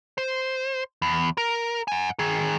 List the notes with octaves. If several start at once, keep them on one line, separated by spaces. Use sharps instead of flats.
C5
E2
A#4
F#5 G#5
D#3 G#4